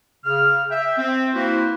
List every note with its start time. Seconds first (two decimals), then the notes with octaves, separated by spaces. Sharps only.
0.25 C#3 F6
0.71 E5 G5
0.97 C4
1.33 A#3 E4 F#4 B4 C5